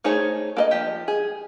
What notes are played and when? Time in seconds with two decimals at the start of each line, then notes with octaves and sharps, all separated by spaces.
0.04 A3 D#4 G#4 C5 C#5
0.57 A#3 A#4 D#5
0.71 F3 G4
1.08 G#4